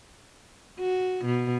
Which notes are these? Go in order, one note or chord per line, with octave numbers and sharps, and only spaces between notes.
F#4
B2